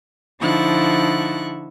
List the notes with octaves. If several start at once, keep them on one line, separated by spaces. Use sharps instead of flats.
D3 F3 D#4 E4 C#6 F#6